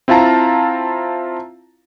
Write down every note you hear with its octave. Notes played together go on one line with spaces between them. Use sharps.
C4 E4 F4 F5 A5 A#5